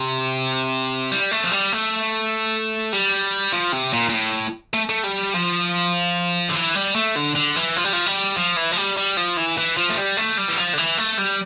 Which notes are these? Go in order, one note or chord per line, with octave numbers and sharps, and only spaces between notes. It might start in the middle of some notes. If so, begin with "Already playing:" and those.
Already playing: C3
G3
A3
F3
G3
A3
G3
F3
C3
A#2
A#2
A2
A3
A3
G3
F3
D3
E3
G3
A3
D3
D3
E3
F3
G3
F3
G3
F3
E3
F3
G3
G3
F3
E3
E3
F3
A3
G3
A3
G3
E3
F3
D3
E3
A3
G3